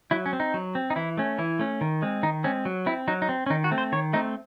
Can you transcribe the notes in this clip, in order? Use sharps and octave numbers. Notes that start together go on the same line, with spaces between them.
F#3 E4
C#4
C4
D#4
F#3
C4
D#4
E3 E4
A3 C#4
E3 E4
A3 C#4
D#3
G#3 C4
D#3 D#4
G#3 C4 C#4
F#3
C4 E4
F#3 D#4
D#4
C4
C#4
D#3 D#4
F#4
A3 C4
C5
D#3 C#5
A3 C4 D#4